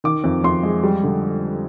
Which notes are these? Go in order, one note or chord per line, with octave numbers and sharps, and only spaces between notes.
D#3 D6
F2
F2 C6
G#3
G3
D3